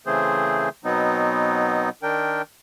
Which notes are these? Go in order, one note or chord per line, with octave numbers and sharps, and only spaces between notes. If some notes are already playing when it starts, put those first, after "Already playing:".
C#3 E3 A3 C4 G#4 C5
B2 F#3 B3 C4 D#4
D#3 D4 A#4 G5